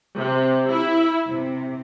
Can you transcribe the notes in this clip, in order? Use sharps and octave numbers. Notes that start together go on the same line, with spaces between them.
C3
E4
C3